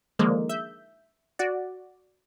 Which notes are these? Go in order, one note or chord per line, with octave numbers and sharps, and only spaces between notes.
D3 D#3 F3 G#3 A#3
E5 G6
F#4 D5